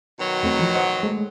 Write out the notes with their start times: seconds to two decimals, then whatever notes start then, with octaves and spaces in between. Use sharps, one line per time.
0.20 B2 D#3 F#3
0.43 E2 A3 C4
0.59 E3 F3
0.75 C5 D#5 F#5
1.03 G#3 A3